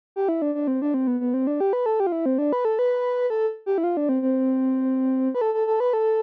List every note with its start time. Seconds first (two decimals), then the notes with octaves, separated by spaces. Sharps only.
0.16 G4
0.28 E4
0.42 D4
0.55 D4
0.67 C4
0.82 D4
0.94 C4
1.07 B3
1.20 B3
1.34 C4
1.47 D4
1.60 G4
1.73 B4
1.86 A4
2.00 G4
2.07 F4
2.12 E4
2.26 C4
2.38 D4
2.53 B4
2.65 A4
2.79 B4
3.30 A4
3.66 G4
3.78 E4
3.84 F4
3.97 D4
4.09 C4
4.22 C4
5.35 B4
5.41 A4
5.54 A4
5.67 A4
5.80 B4
5.93 A4